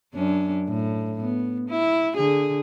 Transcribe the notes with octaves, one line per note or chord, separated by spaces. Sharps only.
F#2 C#4 D4
A2
B3
E4
D3 G#4